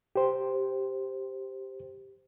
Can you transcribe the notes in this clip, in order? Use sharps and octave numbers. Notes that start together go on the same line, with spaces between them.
G4 C5